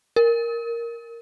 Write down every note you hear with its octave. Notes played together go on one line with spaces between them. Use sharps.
A#4